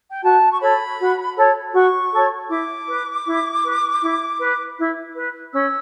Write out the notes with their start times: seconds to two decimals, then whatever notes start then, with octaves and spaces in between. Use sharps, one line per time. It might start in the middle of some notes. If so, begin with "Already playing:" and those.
0.11 G5
0.22 F#4 A5
0.51 C#6
0.61 A4 C#5 B5
0.99 F#4
1.36 A4 C#5
1.74 F#4 C#6
2.12 A4 C#5
2.50 E4 D6
2.88 B4
3.26 E4
3.64 B4
4.02 E4
4.40 B4
4.78 E4
5.15 B4
5.53 C#4 E6